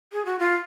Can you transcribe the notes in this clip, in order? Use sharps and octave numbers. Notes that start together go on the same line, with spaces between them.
G#4
F#4
F4